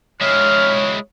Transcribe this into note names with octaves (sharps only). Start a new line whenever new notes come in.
G#3 E4 C#5 F6